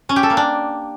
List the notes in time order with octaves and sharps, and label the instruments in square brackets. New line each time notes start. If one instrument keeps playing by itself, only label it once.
[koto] C#4
G4
A4
A#3
D4